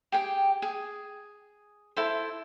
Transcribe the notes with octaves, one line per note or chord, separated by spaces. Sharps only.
G4 G#4 G5
G#4
E4 A4 C5